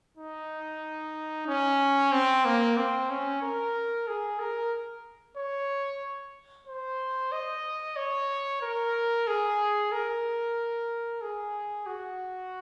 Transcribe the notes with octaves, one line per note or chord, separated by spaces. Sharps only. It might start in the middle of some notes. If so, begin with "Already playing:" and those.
D#4
C#4
C4
A#3
C4
C#4
A#4
G#4
A#4
C#5
C5
D#5
C#5
A#4
G#4
A#4
G#4
F#4